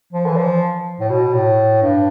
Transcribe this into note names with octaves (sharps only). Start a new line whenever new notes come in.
F3
E3
F3
A2
B2
A2
G2